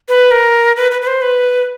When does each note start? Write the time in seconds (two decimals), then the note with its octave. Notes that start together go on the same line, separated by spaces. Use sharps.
0.09 B4
0.31 A#4
0.77 B4
0.91 B4
1.02 B4
1.07 C5
1.22 B4